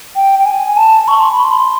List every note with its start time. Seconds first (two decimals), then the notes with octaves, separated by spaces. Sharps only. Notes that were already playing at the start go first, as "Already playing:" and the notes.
0.16 G5
0.40 G5
0.46 G#5
0.77 A5
1.08 C#6
1.20 C6
1.32 B5
1.44 C6